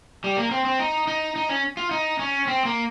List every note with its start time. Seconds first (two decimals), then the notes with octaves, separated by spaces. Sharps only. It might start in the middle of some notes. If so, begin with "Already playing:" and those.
0.24 G3
0.37 A#3
0.51 C4
0.65 C4
0.79 D#4
1.08 D#4
1.36 D#4
1.49 C#4
1.77 F4
1.91 D#4
2.19 C#4
2.47 C4
2.65 A#3